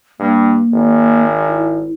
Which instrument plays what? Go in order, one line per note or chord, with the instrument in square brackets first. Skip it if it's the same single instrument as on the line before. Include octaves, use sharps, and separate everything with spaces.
[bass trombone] G2 [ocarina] A#3
[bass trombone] G#1
[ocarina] E4